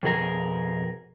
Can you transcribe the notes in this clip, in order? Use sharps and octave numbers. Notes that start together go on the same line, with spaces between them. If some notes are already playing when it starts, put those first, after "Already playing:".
F2 B2 G#4 A#4